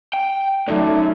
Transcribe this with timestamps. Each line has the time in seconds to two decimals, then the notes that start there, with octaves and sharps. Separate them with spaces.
0.13 G5
0.68 F#2 F#3 A3 D#4 D5